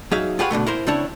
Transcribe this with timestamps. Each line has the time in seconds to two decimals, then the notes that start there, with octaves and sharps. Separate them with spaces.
0.11 F#3 D#4 G#4 E5 F5
0.39 F4 G4 G#4 B4 C#5 F#5
0.51 B2 D3 D#3 A3
0.66 E4 A#4 C5
0.87 C#3 C4 D4 E4 C#5